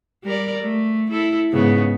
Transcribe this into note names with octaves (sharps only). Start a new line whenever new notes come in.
G3 A#4 D5
A3
E4 A4
G#2 C#3 B3